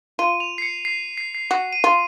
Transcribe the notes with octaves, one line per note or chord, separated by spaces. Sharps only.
F4 D#7
F7
C7
C#7
C7
C7
C7
F#4
D#7
F4